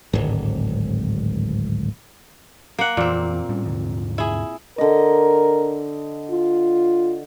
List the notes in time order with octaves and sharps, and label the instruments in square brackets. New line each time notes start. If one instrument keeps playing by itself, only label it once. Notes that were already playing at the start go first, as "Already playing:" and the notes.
[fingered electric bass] D1 G#1
[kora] A#3 F#5
[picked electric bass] F2 E3 [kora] A#2 C4
[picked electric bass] A2 G3 C#4
D#2 G#2 D3
[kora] E4 G#4
[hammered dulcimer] D3 D#5 [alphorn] A#4
[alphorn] F4